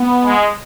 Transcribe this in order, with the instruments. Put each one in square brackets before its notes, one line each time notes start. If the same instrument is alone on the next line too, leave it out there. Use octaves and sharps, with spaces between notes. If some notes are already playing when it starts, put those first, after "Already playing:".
Already playing: [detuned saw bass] B3
[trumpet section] G#3